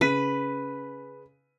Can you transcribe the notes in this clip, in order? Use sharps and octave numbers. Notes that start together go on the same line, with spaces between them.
C#3 B4 B6 D#7